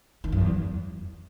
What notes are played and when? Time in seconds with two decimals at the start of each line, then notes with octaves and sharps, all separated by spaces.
0.24 D#3
0.32 F#2
0.41 E2